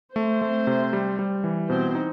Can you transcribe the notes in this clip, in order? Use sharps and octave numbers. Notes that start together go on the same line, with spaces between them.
A3 C4 C5
A3
C3
G3
G3
E3
B2 C4 C5
D#4